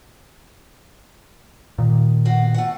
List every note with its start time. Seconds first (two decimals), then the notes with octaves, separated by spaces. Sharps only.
1.78 A#2 D#3
2.25 B2 F#4 F5
2.54 A3 F#5